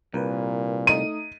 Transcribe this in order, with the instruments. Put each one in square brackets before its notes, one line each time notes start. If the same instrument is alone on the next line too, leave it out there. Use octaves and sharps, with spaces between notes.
[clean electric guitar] C2 [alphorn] A#2 [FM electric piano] A#4 B4
[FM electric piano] A3 D#4 D#6 [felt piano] D#7